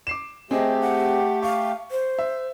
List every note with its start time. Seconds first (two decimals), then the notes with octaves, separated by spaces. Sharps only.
0.07 D6 C7 E7
0.51 A3 C4 G4 G#4 D#5
0.81 F#5
1.42 F5 C#6
1.91 C5
2.19 E5